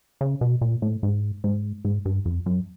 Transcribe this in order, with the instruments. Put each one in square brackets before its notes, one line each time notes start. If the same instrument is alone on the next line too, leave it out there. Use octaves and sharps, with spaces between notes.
[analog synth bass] C#3
B2
A#2
A2
G#2
G#2
G#2
G2
F2
F#2